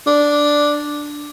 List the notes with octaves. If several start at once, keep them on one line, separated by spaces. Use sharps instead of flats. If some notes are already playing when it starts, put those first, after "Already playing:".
D4